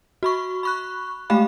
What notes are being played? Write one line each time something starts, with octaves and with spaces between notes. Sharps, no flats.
F#4 B5 C#6
B5 C#6 F#6
G#3 A3 G4 F5 B5